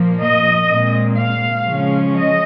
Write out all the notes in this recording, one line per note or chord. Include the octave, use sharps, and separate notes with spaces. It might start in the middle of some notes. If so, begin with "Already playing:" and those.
Already playing: A#2 F3 A#3
D#5
A#2 G#3 C4
F5
C#3 F3 G#3 C#4
D#5